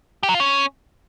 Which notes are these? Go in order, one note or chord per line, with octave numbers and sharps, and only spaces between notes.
G4
F#3
F4
C#4